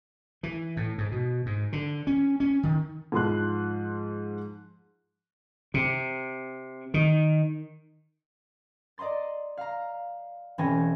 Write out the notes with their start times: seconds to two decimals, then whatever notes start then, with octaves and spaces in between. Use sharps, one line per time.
0.43 E3
0.77 A2
0.98 G#2
1.12 B2
1.46 G#2
1.73 D3
2.07 C#4
2.40 C#4
2.63 D#3
3.12 G#2 F3 C6 F#6
5.74 C3
6.94 D#3
8.98 D5 D#5 A#5 C6 A6
9.57 F5 A#5
10.58 E1 E3 C4 C#4 G#5 A#6